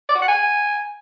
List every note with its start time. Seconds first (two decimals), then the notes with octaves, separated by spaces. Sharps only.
0.09 D5
0.15 F#4
0.22 F#5
0.28 G#5